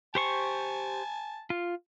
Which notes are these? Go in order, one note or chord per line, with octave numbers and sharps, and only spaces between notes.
G4 C5 G#5 A5 C#6
F4